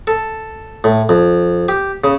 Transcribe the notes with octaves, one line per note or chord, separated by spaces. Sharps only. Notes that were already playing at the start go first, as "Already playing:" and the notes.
A4
A2
F2
G4
C#3